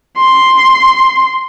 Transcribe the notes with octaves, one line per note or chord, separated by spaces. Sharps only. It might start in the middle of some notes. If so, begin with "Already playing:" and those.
C6